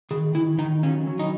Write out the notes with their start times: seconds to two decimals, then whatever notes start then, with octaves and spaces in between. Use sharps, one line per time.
0.11 D#3 G#4
0.35 D#3 E4
0.58 D#3 D#4
0.83 F#3 C#4
1.07 F#3
1.19 D#4